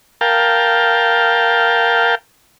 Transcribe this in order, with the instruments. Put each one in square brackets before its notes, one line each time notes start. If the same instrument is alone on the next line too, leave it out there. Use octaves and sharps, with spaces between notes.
[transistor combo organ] A#4 F5 G5 A5